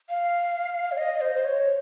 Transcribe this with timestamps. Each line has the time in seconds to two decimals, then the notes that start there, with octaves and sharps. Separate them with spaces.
0.10 F5
0.92 C#5
0.97 D#5
1.21 C5
1.35 C5
1.45 C#5